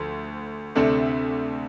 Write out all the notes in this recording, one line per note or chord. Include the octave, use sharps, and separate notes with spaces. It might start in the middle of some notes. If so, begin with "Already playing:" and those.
Already playing: D2 D3 F3
D2 C3 A3 D4 A4